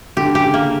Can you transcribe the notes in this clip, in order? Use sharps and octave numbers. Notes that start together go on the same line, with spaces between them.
D3 G4
C#3 G4
C#3 A#3